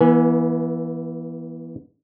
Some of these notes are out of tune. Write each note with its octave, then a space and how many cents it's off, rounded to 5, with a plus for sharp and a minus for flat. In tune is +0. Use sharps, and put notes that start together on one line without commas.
E3 +0 B3 -35 G#5 +0